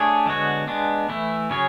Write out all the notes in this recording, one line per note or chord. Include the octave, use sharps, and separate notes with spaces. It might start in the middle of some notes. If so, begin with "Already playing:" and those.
Already playing: A3 D4 G#4 C#5
D3 G#3 B3 F#4 C#5
G#3 B3 D4
E3 A3 E4
C#3 F#3 C#4 G#4 C#5